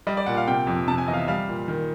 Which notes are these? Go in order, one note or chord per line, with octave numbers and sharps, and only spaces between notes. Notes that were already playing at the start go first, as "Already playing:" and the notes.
G3 D#5
D5
A#2 F#5
F5
C3 G5
F2
C3 A5
G#5
E2 D#5
F5
E5
G3 F5
A#2
D#3